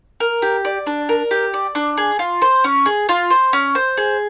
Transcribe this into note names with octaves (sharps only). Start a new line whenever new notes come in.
A#4
G4
D5
D4
A#4
G4
D5
D4
G#4
F4
C5
C#4
G#4
F4
C5
C#4
C5
G#4